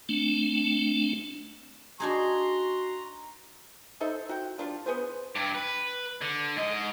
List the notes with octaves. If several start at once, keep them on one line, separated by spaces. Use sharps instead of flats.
A3 C4 D4
D4 D#4 F#4 G#4 A#5 C6
D#4 A4 C5 E5
F#4 G5
F3 G3 D4 F4
B3 G#4 B4 C5
G2 G4
B4
D3
G#2 D#5